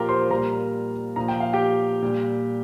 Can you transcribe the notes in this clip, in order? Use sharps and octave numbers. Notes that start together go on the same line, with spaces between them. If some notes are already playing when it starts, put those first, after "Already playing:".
Already playing: A#2 F3 F4 G4 A#4 F5 G5 A#5
C5 C6
A#2 G3 A#4 A#5
A#2 F3 A#5
G5
F5
G4 G5
A#2 G3